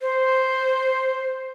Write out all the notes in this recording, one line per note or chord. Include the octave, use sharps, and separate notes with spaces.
C5